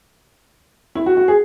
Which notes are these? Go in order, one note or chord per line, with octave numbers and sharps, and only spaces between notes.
E4
F#4
F#4
G#4